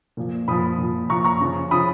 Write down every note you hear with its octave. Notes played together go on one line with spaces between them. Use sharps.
A#2 F3
A#2 F3 B5 D#6
A#2 F3
A#2 F3 A#5 C#6
A#5 C#6
C#3 F3
C#3 F3 B5 D#6